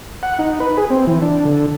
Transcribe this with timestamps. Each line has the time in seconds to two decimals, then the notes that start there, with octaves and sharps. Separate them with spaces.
0.23 F#5
0.39 D#4
0.60 B4
0.77 G#4
0.90 C4
1.07 E3
1.22 D4
1.45 D3